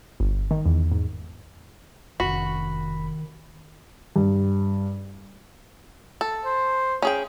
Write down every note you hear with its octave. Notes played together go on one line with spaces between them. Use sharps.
G1
D#3
E2
G#2
F1 D#3 C#4 F#4 B5
G2
A4
C5
C#4 G#4 G5